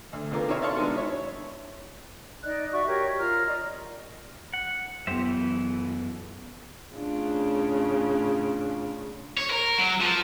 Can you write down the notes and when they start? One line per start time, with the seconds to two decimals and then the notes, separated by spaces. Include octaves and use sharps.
0.13 D2
0.31 C2 D3 B3 F4 A#4 D6
0.48 D#3 C4 E4 F#4 C#5 F5
0.62 D5 E5 F5 A5 C6 C#6
0.76 B2 D#3 G#3 D4
0.95 E4 C#5
2.44 D#4 D5 D#5 F#6
2.71 F#4 D5 E5 C#6
2.87 G4 A#4 C#5
3.18 F4 A#4 A#5 F6
3.46 D5 D#5
4.53 F#5
5.07 F#2 B3 G4 C5 E5
5.25 E3
6.95 A2 C#3 D4 F4
9.37 C#5
9.50 A#4
9.78 F#3
10.01 F3